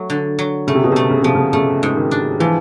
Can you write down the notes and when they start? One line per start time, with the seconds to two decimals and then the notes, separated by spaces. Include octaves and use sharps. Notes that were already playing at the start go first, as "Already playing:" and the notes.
Already playing: F#3 A3
0.10 D3
0.39 F#3
0.67 C#3 A3
0.75 C3
0.84 B2
0.92 C3
0.96 A3
1.10 C#3
1.22 C3 F3
1.35 C#3
1.53 C#3 A3
1.83 G#2
1.96 D#3
2.11 D4
2.40 E3 F3